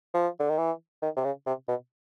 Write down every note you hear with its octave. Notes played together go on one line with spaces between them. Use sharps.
F3
D3
D#3
E3
D#3
C3
C#3
C3
B2